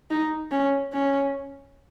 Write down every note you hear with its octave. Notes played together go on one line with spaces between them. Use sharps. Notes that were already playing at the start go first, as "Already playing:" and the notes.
D#4
C#4
C#4